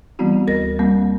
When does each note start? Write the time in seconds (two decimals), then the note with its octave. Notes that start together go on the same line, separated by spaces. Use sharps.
0.19 E3 G3 B3 C4 E4 F#4
0.47 D2 A#4 A#6
0.79 G3 A#3 C4